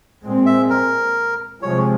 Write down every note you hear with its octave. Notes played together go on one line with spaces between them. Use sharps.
A#2 G#3 C4
E5
A#4
C3 F3 G#3 C#5